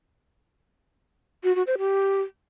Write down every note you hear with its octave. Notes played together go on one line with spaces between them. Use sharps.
F#4
F#4
C5
G4